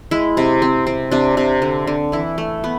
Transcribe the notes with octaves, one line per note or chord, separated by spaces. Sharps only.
G#3 E4
C3
C4
C4
C3 D4
C3
D3
D3
E3 E4
A3
B3